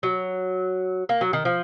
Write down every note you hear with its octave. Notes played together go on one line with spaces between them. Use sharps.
F#3
A#3
F#3
D#3
F3